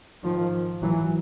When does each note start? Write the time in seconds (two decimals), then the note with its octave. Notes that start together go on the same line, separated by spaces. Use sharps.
0.23 G#2 D#3 F3
0.83 E3 F#3